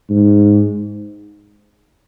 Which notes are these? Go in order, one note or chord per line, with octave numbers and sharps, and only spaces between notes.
G#2